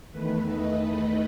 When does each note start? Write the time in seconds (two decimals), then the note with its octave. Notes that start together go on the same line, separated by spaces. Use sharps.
0.12 E2 D#3 A3 B4
0.48 D#5
0.84 D#5